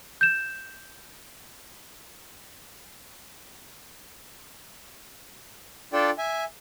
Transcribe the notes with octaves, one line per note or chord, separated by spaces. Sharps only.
G6 E7
D4 F4 A4 D5 G5
E5 G#5